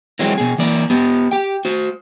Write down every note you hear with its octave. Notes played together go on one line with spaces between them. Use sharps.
E3 F#3 G#3 C4
B2 G#4
E3 A#3 D5
B3 G4
G4 G5
F#4 C5